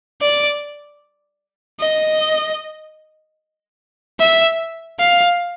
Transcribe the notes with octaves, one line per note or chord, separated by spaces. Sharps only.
D5
D#5
E5
F5